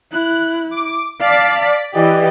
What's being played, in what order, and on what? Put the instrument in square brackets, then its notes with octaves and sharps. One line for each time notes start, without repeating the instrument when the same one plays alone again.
[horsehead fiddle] E4 [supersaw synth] F#6
[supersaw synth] D6
[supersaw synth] D5 B6 [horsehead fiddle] F5 A5
[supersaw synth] E3 [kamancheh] G4 D#5 [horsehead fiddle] D5